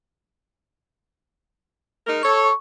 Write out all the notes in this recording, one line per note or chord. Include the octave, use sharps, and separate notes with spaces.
G#3 D#4 A#4
A4 C#5 C#6